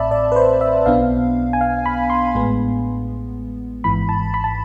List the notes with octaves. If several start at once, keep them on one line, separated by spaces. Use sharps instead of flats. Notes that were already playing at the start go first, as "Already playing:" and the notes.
Already playing: A1 A2 C4 D5 E5 A5 B5
D5
B4
C5
E5
B1 B2 B3 D4 F5
G#5
F5
B5
C6
A1 A2 G#3 B3
G#1 G#2 E3 B5
A5
B5
A5